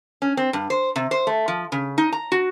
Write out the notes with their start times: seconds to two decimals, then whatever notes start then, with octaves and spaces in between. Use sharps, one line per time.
0.22 C#4
0.37 C4
0.53 G2
0.70 C5
0.96 C3
1.11 C5
1.27 A3
1.48 F3
1.72 C#3
1.98 D#4
2.12 A#5
2.32 F#4